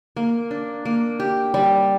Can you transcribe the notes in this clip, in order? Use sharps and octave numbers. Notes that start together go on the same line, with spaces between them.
A#3
D4
A#3
G4
G3